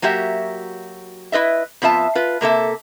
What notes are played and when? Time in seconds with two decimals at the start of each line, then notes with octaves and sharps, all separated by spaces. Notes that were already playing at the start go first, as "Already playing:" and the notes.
0.02 F#3 A#3 F#4 G4 E5
1.32 E4 F4 B4 D#5 E5
1.82 F2 B3 F4 E5 A5
2.15 F4 B4
2.41 C3 A#3 A4 E5